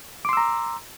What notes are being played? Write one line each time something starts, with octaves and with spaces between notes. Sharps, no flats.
A#5 C6 D6 E6